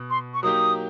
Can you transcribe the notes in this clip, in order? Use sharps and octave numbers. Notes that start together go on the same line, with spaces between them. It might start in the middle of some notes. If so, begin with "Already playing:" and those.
Already playing: B2
C6
C#6
F#3 A#3 D#4 G4 D#6